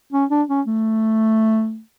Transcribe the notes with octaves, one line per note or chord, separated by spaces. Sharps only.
C#4
D4
C#4
A3